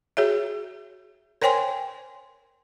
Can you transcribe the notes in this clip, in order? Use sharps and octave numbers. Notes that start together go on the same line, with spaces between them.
F#4 G#4 C#5 E5
A#4 C5 C#5 G5 G#5 C6